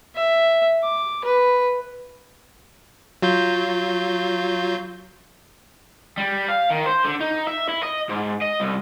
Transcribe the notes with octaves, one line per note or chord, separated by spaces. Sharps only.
E5
D6
B4
F#3 F4 G6
G3
F5
D#3
C5
D3
D#4
E5
E4
D#5
G#2
D#5
C2